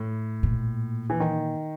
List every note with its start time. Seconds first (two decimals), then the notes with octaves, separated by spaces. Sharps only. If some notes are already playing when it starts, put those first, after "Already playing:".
Already playing: A2
0.43 A#2
1.10 E3
1.20 D#3